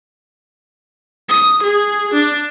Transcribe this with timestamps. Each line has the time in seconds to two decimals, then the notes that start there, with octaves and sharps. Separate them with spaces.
1.29 D#6
1.63 G#4
2.14 D4